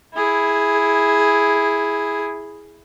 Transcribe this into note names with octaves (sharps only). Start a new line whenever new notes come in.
E4 G#4